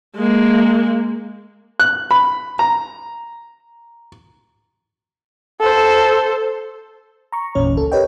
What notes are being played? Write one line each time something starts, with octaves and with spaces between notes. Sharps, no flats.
G#3 A#3
F#6
B5
A#5
A4 C5
A#5 C#6
G#1 E2 A#2 C#4 C#5
C#2 A4
G4 A#4 B4 C#5 D#5 G5